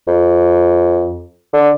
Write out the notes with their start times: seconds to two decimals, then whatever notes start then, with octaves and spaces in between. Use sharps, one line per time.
0.08 F2
1.53 D3